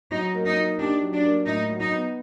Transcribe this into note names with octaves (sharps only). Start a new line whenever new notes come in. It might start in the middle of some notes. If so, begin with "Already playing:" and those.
F#3 D#4
A#3
D#4
D#4
D4 G4
F#3
D4
A#3
A2 D#4
F#3
D#4
B3